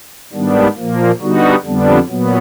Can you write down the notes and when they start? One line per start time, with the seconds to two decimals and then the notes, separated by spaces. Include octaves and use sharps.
0.33 G#2 D#3 G3 B3 D4
0.76 A#2 F3 A#3
1.20 D3 G3 B3 D#4 F#4
1.64 F2 D3 G3 B3 D4
2.08 A#2 F#3 B3